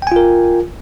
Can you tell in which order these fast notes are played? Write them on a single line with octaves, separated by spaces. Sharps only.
G5 G#5 F4 A#4